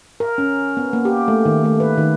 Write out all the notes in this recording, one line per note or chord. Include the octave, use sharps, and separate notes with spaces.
A#4
C#4
B3
A#3
G4
A3
D#3
A3
B4
D#3